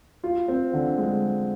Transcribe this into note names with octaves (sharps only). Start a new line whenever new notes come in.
F4
C4
D3
G#3